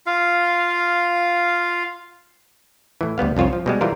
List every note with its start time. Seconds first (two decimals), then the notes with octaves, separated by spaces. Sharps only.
0.06 F4 F5
3.01 A2 E3
3.18 D2 G3 B3 F5
3.37 C2 F2 F4 C5 C#5
3.53 F3
3.66 B2 G3 G#3
3.81 E3 G3 F4 A#4 C5